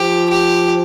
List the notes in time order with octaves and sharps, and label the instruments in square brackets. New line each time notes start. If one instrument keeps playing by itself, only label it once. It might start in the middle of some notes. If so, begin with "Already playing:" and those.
Already playing: [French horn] F3 [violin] G4
[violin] G4